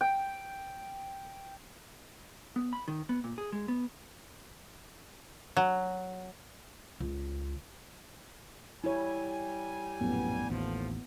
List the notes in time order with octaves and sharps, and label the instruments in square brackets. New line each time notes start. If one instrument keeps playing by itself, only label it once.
[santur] G5
[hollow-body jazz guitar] B3
B5
D#3
B3
A#2
G#4
G#3
B3
[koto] F#3
[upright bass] C#2
[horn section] G3 G#5 [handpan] E4 C#5
[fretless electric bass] A#1 F#2 A2 [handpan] B3
[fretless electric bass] A1 D#2 [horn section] A2 F3